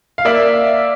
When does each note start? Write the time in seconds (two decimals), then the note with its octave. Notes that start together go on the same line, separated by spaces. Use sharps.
0.18 F5
0.25 A#3 D5 E5